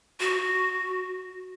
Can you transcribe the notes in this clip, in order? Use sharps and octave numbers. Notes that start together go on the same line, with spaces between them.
F#4